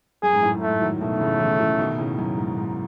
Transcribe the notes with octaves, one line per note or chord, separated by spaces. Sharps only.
F#2 G#4
G#2
F#2 A2
G#2 A3
D#3 F#3
B2 D#3 A3
D#3
A2 C#3
C#3 E3
C#3 E3
B2 D#3
B2
A2 C#3
F#2 A2
G#2
G#2